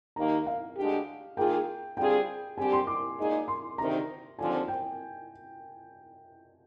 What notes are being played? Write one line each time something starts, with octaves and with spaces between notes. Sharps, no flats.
D#2 D#3 A#3 A#5
F5
D2 D3 G#3 D4 G4
D#3 A#3 F4 G#4 G5
D3 G3 C4 F4 G#4 G5
D3 G3 C4 G4 G#5
C6
D6
A#2 G#3 D#4 G#4
C6
D2 C3 D#3 A#5
D#2 D3 F3 C4 F4 G#5
G5